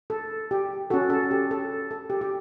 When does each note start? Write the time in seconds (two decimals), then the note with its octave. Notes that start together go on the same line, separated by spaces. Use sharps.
0.10 A4
0.51 G4
0.90 C#4 F#4 A4
1.10 A4
1.31 G4
1.51 A4
1.91 A4
2.10 G4
2.21 G4